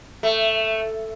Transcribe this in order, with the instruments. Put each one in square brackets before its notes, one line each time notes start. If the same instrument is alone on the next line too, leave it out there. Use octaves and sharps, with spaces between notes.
[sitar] A3